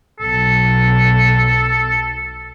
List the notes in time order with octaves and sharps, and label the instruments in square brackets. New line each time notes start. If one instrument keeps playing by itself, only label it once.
[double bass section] B1 [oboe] A4